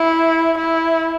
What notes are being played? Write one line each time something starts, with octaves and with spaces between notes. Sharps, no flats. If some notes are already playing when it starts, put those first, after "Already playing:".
Already playing: E4
E4